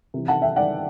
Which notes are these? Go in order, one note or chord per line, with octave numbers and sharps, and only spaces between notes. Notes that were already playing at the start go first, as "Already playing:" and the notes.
C3 E3
F#5 A5
E5 G5
D5 F#5